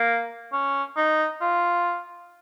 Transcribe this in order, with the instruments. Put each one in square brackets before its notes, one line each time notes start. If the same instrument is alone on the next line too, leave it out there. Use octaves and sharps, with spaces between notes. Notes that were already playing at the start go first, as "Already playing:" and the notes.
Already playing: [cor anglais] A#3
C#4
D#4
F4